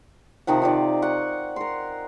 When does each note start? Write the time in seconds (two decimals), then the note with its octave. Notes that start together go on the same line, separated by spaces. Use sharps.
0.47 C3 D#3 F3 F#5
0.62 D#4 F4 D5
1.02 F#5 C#6
1.56 A#4 C6